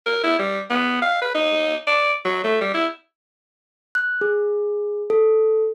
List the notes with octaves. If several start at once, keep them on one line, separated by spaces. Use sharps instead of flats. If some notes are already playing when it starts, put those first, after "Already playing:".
A#4
E4
G3
B3
F5
B4
D#4
D5
F#3
A3
G3
E4
F#6
G#4
A4